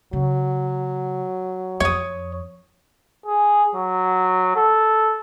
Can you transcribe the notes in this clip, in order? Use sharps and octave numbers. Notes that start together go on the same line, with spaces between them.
C#3 F#3
F2 C#5 D#6
G#4
F#3
A4